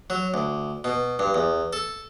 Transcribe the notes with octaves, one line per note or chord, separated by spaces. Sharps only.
F#3
D2
B2
G2
E2
A4